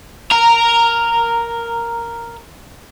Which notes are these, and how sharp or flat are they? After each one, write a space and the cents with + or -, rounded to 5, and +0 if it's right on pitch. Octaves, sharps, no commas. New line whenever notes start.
A#4 +0 A#5 -10